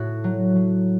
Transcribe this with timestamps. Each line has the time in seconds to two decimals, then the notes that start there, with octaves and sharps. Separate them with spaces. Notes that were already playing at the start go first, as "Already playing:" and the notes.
Already playing: A2 F#4
0.24 F#3
0.56 F#3